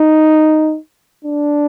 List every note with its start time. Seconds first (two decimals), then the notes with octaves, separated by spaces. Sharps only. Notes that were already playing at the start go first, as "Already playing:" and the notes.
Already playing: D#4
1.25 D4